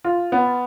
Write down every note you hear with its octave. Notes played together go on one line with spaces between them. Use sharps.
F4
B3